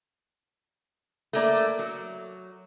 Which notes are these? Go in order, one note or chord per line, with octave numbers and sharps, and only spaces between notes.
A3 A#3 D5
F#3